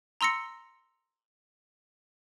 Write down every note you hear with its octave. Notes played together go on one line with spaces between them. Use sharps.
A#5 C6 E6 A#6 C#7